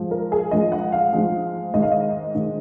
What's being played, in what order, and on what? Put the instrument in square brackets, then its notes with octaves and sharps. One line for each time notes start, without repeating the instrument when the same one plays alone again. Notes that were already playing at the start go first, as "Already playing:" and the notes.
Already playing: [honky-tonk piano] G#2 F3 G#3
A#4
G#4
G#2 F3 G#3 D#5
F#5
F5
G#2 F3 G#3
G#2 D#3 G#3 D#5
F5
D#5
G#2 D#3 G#3